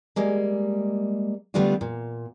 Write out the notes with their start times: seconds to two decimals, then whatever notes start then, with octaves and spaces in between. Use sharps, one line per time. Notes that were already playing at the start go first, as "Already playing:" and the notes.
0.16 G3 G#3 A#3
1.54 D3 G3 A3 B3 D4 F4
1.81 A#2